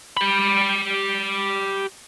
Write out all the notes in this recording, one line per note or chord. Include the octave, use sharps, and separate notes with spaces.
G4 B5